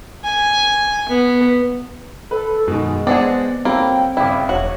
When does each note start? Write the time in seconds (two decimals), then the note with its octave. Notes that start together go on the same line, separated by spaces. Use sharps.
0.24 G#5
1.09 B3
2.31 A4 B4
2.68 F#2 B2 D#3 G#3
3.07 B3 C4 D4 G#4 D5 F#5
3.65 F#3 A#3 C4 A4 G5 B5
4.17 G1 C#3 E4 D6
4.49 E1 F#4 C#5